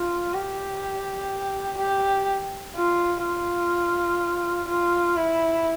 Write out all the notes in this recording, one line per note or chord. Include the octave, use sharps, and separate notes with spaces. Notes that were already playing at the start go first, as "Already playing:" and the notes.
Already playing: F4
G4
G4
F4
F4
F4
E4